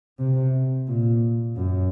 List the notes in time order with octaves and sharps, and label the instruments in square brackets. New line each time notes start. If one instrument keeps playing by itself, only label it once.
[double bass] C3
A#2
F#2